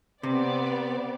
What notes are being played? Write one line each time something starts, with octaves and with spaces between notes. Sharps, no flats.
C3 B3 C4 D5